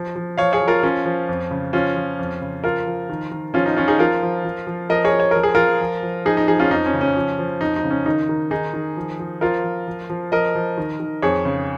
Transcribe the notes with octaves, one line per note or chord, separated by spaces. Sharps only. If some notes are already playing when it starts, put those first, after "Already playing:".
Already playing: F3
F3
F3 C#5 F5
G#4 C#5
F3
F4 A#4
F3 C#4 F4
F3
F2
C#3
F3 C#4 F4
F3
F2
C#3
F3 F4 A#4
F3
D#3
D#3
F3 C#4 F4
D#4
F3 C#4 F4
D#4 G#4
F3 F4 A#4
F3
F3
F3
F3 A#4 D#5
G#4 C#5
F3
C#5
F3 A#4
G#4
F3 F4 A#4
F3
F3
F3 D#4 G#4
D#4
F3 D#4 G#4
C#4 F4
F2 D#4
C#4
C#3
C#4
F3
F3
F2 D#4
D#4
C#3
C#4
D#3 D#4
D#3
D#3 D#4 G#4
D#3
F3
F3
F3 F4 A#4
F3
F3
F3
F3 A#4 D#5
F3
D#3
D#3
F2 G#4 C#5
C#3